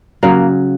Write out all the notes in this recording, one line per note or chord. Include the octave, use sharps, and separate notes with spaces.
C#3 F#3 A#3